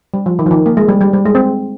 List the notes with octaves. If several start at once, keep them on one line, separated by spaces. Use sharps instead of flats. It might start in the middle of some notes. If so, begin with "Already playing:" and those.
G3
F3
D#3
F3
D#3
A#3
G#3
G3
G3
G3
G#3
C4